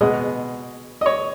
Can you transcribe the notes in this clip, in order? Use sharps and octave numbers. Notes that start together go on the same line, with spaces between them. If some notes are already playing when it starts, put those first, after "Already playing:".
B2 G#3 B3 D#5
D#5
C#5